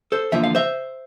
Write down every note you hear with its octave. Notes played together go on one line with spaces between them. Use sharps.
A4 C5
E2 D3 F3 A#3 E5
F5
C5 E5